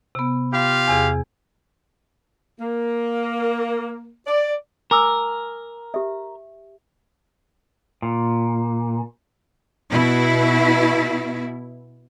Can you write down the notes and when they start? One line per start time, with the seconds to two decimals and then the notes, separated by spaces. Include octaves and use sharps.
0.15 C3 B3
0.52 F4 G4 F5
0.88 E2 C3 G#4
2.60 A#3
4.27 D5
4.91 A#4 G#5 D6 E6
5.94 G4 E5
8.02 A#2
9.91 B2 E4